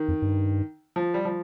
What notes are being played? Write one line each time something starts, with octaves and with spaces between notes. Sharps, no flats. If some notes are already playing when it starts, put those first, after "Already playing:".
Already playing: D#3
F2
G2
F3
G3
F3